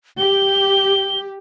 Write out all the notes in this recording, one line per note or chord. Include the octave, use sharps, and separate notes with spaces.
G4 G7